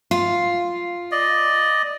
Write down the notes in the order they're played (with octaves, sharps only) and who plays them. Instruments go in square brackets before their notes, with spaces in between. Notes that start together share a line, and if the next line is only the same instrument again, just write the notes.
[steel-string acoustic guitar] F4
[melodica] D5 D#5